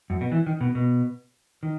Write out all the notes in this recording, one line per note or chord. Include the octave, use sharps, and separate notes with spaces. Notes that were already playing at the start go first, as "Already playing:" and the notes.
F#2
B2
E3
D#3
B2
B2
D#3